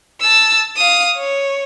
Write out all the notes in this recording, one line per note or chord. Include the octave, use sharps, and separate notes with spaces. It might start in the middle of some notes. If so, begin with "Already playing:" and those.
A5 E6
F5 D#6
C#5